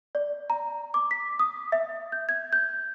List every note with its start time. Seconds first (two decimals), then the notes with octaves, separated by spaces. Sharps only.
0.15 D5
0.50 A#5
0.94 D6
1.11 B6
1.39 D#6
1.72 E5
2.12 G6
2.29 G#6
2.53 G6